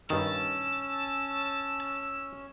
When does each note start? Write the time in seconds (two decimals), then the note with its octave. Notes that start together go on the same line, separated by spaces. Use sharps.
0.10 G2 D#3 C#4 A5 E6